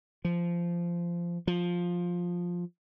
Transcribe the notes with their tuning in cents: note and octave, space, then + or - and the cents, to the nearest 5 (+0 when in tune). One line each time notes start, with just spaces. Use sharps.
F3 -15
F3 +10